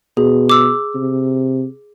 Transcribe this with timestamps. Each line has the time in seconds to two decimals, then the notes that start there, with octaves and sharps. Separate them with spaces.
0.17 B2 G#4
0.49 D6 E6
0.95 C3